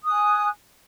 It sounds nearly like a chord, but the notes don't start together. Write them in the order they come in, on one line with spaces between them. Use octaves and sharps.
D#6 F#6 G#5